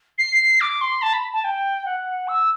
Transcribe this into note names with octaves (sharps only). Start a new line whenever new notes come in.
C7
D6
C6
A5
B5
A5
G5
F#5
E6